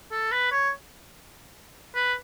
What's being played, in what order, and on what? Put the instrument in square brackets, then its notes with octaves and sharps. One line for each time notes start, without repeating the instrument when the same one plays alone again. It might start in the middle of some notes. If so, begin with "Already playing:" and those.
[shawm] A4
B4
C#5
B4